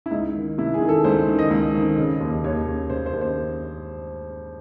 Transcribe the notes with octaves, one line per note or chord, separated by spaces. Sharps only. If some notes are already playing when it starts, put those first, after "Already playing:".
E4
C#2 D#4
D#3
C3 E4
G#4
D#3
A4
C#2 C5
D#3
D#5
C#2
D#3
C#3
D#2
D#2 C#5
C#3
C#3 C5
C5
D#2
C5